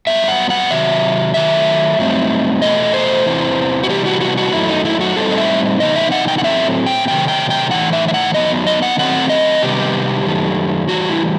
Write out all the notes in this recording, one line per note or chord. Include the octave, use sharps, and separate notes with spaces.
G2 F#3 B3 E5
F#5
F#5
C3 D#3 F#3 E5
D#3 F#3 A3 E5
G2 F#3 A3 C4 D#4
E2 B2 A3 D#5
C5
E2 C3 E3
F#4
C3 E3 G3 B3 G4
F#4
F#4
F#4
F#2 D#3 F#3 A3 D#4 E4
D#4
E4
F#4
A2 G3 C4 D#4 A4
D#5
E5
C3 E3 B3 D#4 D#5
E5
F#5
G5
F#5
A2 F#3 A3 C4 E5
G5
C3 D#3 F#3 A3 G5
G5
G5
A2 E3 G3 B3 D#4 F#5
E5
E5
F#5
F#2 F#3 B3 D#4 D#5
D#5
F#5
D#3 F#3 A3 C4 F#5
D#5
C3 D#3 G3 B3 G4
F#2 D#3 A3
A2 E3 G3 F#4
E4